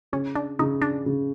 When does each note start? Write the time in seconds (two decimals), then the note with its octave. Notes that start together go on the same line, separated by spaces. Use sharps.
0.12 C#3 C#4
0.36 D4
0.59 C#3 D#4
0.82 D4
1.06 C#3